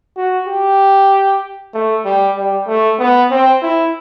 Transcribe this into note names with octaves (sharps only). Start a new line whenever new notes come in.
F#4
G4
A3
G3
G3
A3
B3
C4
E4